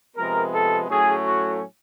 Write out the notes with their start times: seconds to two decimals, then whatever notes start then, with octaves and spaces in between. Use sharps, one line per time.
0.16 C3 F3 G#3 B3 A#4
0.53 A4
0.90 A2 F#3 A3 C#4 G#4
1.26 F#4